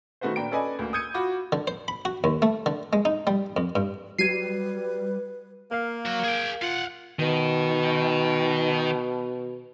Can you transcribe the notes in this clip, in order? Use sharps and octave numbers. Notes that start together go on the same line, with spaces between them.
D#3 A3 B3 F#4 B4 C5
A#2 D4 G5 A#5 B5 D7
C#4 A4 B4 D5 D#5 G#5
D2 A#3
D#6 E6 G6 G#6 C#7 D#7
F4 F#4 B5 D6
D3
C5
B5
F#4
D#2
A3
D3
G#3
D#4
G3
F2
G2
F#3 G3 B4 G#6 C7 D#7
A#3 A#4 F5
F#3 F#4
G#4 G5
F4 F5 F#5
B2 D#3